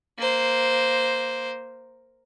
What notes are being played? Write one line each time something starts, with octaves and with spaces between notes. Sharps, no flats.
A#3 C5